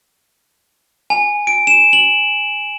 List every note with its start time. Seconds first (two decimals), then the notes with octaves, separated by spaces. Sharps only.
1.10 G#5
1.47 D7
1.67 E7
1.93 F#7